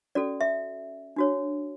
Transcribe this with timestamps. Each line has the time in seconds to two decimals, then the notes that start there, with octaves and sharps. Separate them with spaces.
0.15 C#4 F#4 A4 D5
0.41 E5
1.16 D4 F#4 C#5